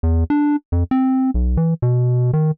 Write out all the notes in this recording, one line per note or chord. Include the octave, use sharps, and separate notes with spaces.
E2
D4
F2
C4
B1
E3
B2
D#3